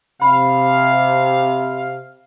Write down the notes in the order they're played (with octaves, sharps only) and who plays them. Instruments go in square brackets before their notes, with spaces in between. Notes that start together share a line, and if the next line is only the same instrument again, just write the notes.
[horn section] C3 F5 [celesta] B5